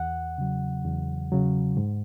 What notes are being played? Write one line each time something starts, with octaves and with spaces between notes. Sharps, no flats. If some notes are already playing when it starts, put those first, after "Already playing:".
Already playing: E2 F#5
C#3 F#3
E2
C#3 F#3
G#2